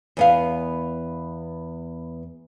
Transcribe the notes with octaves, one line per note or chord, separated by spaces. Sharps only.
E2 B3 F5